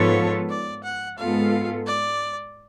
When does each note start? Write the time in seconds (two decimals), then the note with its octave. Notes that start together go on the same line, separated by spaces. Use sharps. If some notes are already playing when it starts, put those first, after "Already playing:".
Already playing: G#2 F3 B3 F4 A4 C#5
0.50 D5
0.84 F#5
1.18 G#2 G#3 B3 F4 A4 F5
1.87 D5